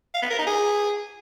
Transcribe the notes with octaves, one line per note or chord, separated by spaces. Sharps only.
F5
B3
A#4
D#4
G#4